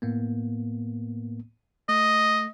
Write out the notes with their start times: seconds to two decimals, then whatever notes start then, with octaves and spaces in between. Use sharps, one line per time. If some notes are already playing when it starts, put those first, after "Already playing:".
0.02 A2 A#3 B3
1.89 A3 D#5